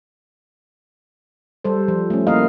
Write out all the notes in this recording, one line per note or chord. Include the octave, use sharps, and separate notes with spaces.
G3 A4 C5
F3
A3 C#4
A#3 E4 A#4 D#5 F5